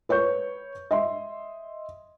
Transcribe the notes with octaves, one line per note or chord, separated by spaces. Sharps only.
B4 C#5 C#6 G6
D#5 E5 C6